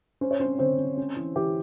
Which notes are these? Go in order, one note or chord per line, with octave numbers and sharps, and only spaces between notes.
C#4 C5
C#5
C4 C#4 C5
D3 C4 C5
C#4
C#4
E3
E3 G4